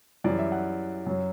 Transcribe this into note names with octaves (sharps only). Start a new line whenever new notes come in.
F#2 E3 G3 D5
E5
F#5
F#2 F#3